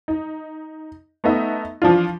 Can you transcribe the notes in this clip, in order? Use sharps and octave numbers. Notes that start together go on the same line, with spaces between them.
D#4
A3 B3 D#4 D#5 E5
E3 F3 D4 F4